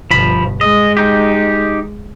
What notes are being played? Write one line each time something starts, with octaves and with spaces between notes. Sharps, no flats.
G1 B2 F3 B5
G#3 D#5
D#4 G4